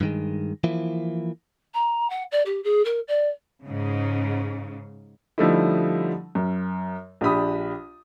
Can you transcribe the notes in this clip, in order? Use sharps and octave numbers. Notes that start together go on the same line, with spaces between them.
G2 D#3 G#3
E3 F3 A#3 E4
A#5
F#5
D5
G4
G#4
A#4
D5
G#2 C#3
D3 F3 G3 A3 D#4 E4
F#2
A#1 D4 G4 B5 D#6